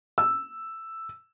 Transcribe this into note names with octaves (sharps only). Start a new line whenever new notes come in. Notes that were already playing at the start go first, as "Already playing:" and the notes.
E6